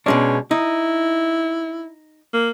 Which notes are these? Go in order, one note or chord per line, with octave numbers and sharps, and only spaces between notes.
B2 G#3 C#4 D4
D#4 E4
A#3